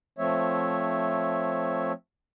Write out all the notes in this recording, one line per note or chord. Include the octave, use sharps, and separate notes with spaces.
F3 A3 C4 C#5 E5